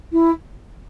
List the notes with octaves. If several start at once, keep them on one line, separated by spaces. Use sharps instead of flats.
E4